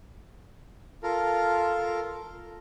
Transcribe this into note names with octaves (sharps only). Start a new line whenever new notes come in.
F4 A4 A#4